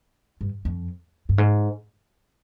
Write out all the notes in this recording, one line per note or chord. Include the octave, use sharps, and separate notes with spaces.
G2
F2
G2
G#2